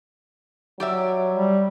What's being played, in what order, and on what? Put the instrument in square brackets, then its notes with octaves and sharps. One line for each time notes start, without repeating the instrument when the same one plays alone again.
[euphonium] F#3 [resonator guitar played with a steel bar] G4 D5 E5
[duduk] G3